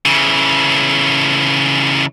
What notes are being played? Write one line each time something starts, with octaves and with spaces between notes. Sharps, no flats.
C#3 E3